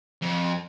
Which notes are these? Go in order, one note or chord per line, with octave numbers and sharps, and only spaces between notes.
F2